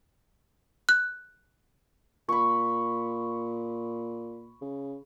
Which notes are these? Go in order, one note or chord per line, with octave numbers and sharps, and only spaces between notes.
F#6
A#2 B5 C#6
C#3